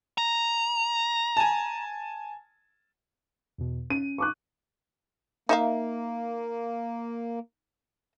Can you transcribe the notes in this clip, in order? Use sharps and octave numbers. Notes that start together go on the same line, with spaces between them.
A#5
G#5 A5
E2 B2
C#4 D#7
C#6 D6 F#6
A#3 D#4 E5 F5